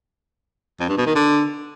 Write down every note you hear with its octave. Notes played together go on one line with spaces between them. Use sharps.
F2
G2
B2
D#3
D3